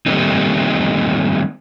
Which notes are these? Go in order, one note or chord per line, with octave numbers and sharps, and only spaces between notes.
D#3 G3 A3 A#3 C4 D#4